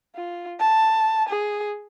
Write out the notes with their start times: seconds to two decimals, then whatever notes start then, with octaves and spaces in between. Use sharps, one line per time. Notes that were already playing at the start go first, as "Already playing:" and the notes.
0.15 F4
0.60 A5
1.29 G#4